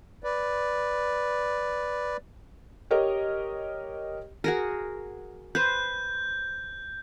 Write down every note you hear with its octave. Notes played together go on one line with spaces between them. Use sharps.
B4 D5
G4 A#4 C#5 D#5
F#4 G#4 A#4
B4 C5 G6